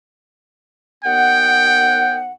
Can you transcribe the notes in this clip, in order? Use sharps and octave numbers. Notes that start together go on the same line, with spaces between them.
D#2 B3 F#5 G5